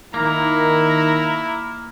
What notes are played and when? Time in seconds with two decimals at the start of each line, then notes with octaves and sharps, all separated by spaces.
0.14 D#3 A#3 E4 A#5